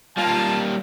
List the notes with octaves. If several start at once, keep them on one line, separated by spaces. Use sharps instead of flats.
G3 A#3 F4 A5